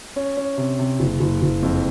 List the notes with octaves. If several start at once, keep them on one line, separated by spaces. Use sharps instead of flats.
C#4
C#4
C3
C3
F#1
F#1
F#1
F2